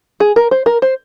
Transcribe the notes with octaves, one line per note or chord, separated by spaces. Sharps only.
G#4
A#4
C5
A#4
C5